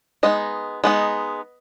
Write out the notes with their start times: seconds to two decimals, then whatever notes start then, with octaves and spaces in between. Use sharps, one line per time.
0.23 G#3 B3 D#4 D#5
0.84 G#3 B3 D#4